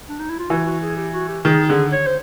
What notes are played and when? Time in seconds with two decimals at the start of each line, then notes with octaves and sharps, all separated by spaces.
0.09 D4
0.19 D#4
0.30 E4
0.40 F4
0.50 E3 F#4
0.66 F#4
0.82 G#4
0.97 G4
1.14 F#4
1.29 G4
1.45 D#3 G#4
1.68 D3 G#4
1.92 C#5
2.07 C5